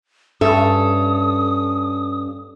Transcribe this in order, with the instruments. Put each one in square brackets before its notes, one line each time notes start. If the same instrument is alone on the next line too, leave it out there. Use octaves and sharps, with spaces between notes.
[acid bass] G2 [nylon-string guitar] C#4 E5 [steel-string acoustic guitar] A4 [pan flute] D#6